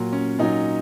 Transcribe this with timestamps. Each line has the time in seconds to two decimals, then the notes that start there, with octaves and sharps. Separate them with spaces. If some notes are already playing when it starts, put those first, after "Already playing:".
Already playing: A#2 F#3
0.13 C#4
0.39 A#2 F#3 D#4